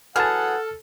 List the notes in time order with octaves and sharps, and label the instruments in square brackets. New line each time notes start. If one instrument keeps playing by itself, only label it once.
[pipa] E3 F#3 G#4 [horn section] A4 [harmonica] F#5 [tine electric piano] A5 F6